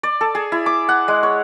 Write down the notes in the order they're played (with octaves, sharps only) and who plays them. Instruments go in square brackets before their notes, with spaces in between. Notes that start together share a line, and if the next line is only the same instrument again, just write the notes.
[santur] D5
A4
G#4
E4
D6
F#5
G#3
C#5